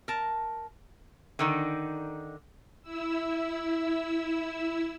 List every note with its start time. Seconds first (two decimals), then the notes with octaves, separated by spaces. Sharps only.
0.08 A#4 A5
1.39 D3 D#3 D#4
2.82 E4 E6